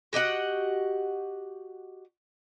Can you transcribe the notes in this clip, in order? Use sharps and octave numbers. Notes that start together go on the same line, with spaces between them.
F#4 G4 D#5 F#5